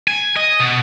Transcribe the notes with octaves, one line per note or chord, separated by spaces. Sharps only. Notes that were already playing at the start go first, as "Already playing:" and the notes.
G#5
D#5
B2